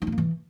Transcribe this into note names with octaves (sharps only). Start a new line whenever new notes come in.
D#4
B3
A#3
E3